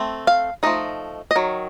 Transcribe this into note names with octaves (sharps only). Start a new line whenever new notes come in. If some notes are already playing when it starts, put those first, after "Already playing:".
Already playing: A3 C4
F5
F3 A3 D#4 D#5
D#5
D#3 F#3